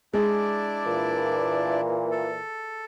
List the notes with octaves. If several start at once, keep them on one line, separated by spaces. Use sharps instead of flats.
G#3 D4 E4 D5
A#2 E3
A4